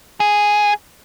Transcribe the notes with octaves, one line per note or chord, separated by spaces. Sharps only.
G#4